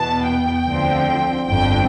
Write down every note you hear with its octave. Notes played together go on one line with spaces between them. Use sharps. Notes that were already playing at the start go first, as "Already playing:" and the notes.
Already playing: E2 B2 B3 A5
G5
D2 D3 F3 C4
G1 F2 D3 G5